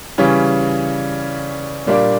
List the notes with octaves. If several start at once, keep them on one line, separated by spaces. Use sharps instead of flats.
C#3 E3 G3 C#4
A#2 G3 A#3 D4